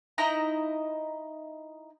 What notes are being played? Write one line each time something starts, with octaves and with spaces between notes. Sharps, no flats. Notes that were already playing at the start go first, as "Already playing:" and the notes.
D#4 E4 D#5 A#5